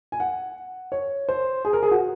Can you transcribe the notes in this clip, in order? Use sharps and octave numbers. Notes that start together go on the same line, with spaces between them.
G#5
F#5
C#5
C5
G#4
A#4
G#4
F#4